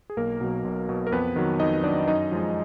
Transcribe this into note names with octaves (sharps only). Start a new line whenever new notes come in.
G#4
B1 A#3 A#4
B2 F#3
B1
B2 F#3
A#4
F2 B3 B4
D#3 F#3
F2 D#4 D#5
D#3 F#3 D4 D5
F#2 D#4 D#5
F3 G#3